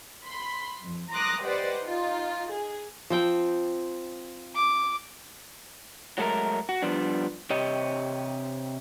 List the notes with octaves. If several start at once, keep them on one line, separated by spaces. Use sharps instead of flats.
B5 C6
F2
A#5 C6 D6 D#6 F#6 A#6
G4 B4 C5 D5 D#5 F#5
D#4 F4
G#4
F3 C4 G5
D6
F#3 G#3 A3 A4 A#4
F#4
F3 G3 B3 D4
C3 G4 C#5 D#5